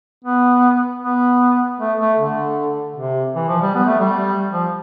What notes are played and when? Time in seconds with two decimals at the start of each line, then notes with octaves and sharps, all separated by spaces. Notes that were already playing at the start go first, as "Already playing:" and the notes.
0.24 B3
1.02 B3
1.80 A3
2.00 A3
2.19 D3
2.96 C3
3.35 E3
3.48 F3
3.62 G3
3.75 B3
3.87 A3
4.00 G3
4.52 F3